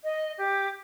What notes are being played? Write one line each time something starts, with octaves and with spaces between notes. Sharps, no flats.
D#5
G4